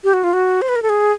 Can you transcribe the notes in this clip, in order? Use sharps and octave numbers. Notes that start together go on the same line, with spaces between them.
G4
F#4
F4
F#4
C5
B4
A#4
A4
G#4